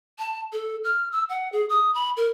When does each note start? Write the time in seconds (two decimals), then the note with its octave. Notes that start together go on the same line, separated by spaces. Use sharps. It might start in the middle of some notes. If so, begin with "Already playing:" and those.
0.19 A5
0.53 A4
0.84 F6
1.12 E6
1.29 F#5
1.52 G#4
1.69 D#6
1.95 B5
2.17 A#4